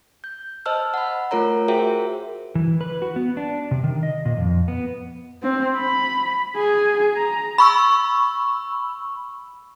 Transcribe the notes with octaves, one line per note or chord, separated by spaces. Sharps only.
G6
C5 D#5 A5 E6 F6
F#5 B5
A3 F4 A#4 C#5 A#5
F#4 G#4 A#4 C5 E5 G5
E3
B4
F#4
B3
D4
C3
D#3
D#5
A#2
F2
B3
C4
B5
G#4
A#5
B5 C#6 E6